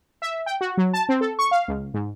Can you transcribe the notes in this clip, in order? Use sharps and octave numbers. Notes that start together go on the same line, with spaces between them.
E5
G5
F#4
F#3
A5
C4
A4
C#6
F5
C#2
G#2